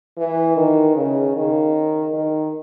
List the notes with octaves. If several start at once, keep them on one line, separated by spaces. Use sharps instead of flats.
E3
D#3
C#3
D#3
D#3